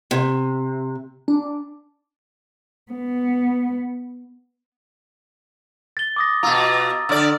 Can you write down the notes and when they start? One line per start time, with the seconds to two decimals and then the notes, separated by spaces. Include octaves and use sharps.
0.11 C3
1.28 D4
2.92 B3
5.97 A6 G7
6.16 D6 D#6 A#6
6.43 B2 F4 A#5 E6 A6
7.09 D3 D5 E6 F6